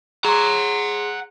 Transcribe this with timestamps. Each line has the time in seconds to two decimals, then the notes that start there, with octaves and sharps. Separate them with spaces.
0.25 G#4 F#5 A#5 C6